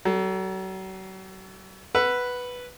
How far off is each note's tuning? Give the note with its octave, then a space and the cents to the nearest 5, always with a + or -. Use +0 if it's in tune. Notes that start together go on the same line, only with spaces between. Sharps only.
F#3 +40 A4 +10
B4 +0 F#5 +0 E6 +20